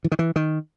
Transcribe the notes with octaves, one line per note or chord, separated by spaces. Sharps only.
E3
D#3
E3
D#3